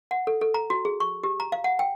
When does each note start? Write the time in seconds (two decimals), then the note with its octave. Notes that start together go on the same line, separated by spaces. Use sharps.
0.11 F#5
0.27 A4
0.41 A4
0.54 A#5
0.70 F#4
0.85 G#4
1.00 C#6
1.23 G4
1.40 A#5
1.52 F5
1.64 F#5
1.79 G5